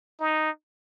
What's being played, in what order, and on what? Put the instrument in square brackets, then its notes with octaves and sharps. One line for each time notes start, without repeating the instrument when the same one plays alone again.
[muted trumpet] D#4